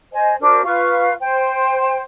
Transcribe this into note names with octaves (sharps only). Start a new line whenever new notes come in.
C5 D#5 G#5
D4 F#4 A#4 C5
F4 B4 F5 C#6
C5 G5